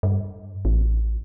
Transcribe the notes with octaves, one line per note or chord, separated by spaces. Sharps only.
G2
A1